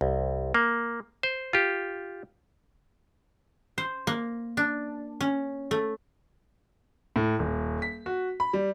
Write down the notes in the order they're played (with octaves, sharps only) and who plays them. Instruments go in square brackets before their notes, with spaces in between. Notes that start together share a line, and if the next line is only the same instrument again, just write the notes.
[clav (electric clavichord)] C2
A#3
C5
F4 G4
[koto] C5
A#3
D4
C#4
A3
[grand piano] A2
D#1
B6
F#4
B5
G3